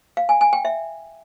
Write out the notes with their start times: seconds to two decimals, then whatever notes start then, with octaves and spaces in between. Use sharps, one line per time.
0.17 F5
0.29 G#5
0.41 G#5
0.53 G5
0.65 E5